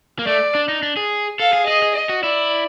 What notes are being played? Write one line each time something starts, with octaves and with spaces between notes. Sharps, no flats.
A#3
A3 D5
D4
D#4
D4
G#4
A4 F5
G#4
G#4 D#5
G#4
D#5
F#4
E4 D5